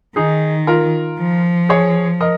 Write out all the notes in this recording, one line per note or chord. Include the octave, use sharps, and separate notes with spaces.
D#3 D#4 G#4
F4 A#4
F3
G#4 C#5
A#4 D#5